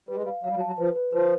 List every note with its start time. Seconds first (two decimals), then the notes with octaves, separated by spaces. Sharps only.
0.08 G3 B4
0.15 G#3
0.23 G3
0.26 F5
0.43 F#3 F5
0.50 G3
0.56 F#3
0.61 A5
0.67 F#3
0.78 F3 B4
0.96 B4
1.13 F3 B4